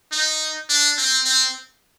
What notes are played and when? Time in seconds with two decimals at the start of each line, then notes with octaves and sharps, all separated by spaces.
0.12 D#4
0.69 D4
0.98 C4
1.25 C4